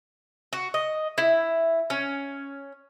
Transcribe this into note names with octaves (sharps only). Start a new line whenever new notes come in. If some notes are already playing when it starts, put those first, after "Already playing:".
F#4
D#5
E4
C#4